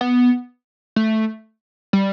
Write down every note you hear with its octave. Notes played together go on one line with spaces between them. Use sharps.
B3
A3
G3